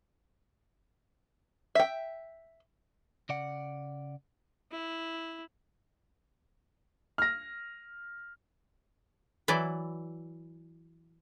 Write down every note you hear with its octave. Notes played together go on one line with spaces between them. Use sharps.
E5 G5
C#3 D5 F#5
E4
F6 A#6
E3 F#3 E4 D5